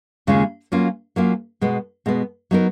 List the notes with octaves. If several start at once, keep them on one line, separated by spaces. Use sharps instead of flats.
D#2 C#3 G#3 C#4 F4
F#3 A#3 C#4 F4
F#3 A#3 C#4 F4
B2 G#3 B3
B2 G#3 B3
F#3 B3 D#4 A#4